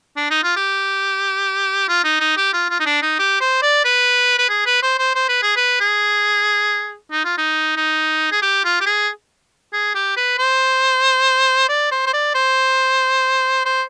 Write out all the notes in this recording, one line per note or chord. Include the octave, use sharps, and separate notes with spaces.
D4
D#4
F4
G4
F4
D#4
D#4
G4
F4
F4
D#4
D4
D#4
G4
C5
D5
B4
B4
G#4
B4
C5
C5
C5
B4
G#4
B4
G#4
D#4
F4
D#4
D#4
G#4
G4
F4
G4
G#4
G#4
G4
B4
C5
D5
C5
C5
D5
C5
C5